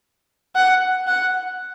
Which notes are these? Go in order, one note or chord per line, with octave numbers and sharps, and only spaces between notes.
F#5
F#5